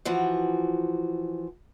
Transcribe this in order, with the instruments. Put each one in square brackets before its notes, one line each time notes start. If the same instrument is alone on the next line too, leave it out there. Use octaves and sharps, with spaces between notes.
[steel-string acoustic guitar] E3 F3 F#4